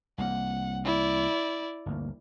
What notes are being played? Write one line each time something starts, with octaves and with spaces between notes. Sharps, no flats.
C2 A#3 F#5
E4 D5
G1 D2 A#3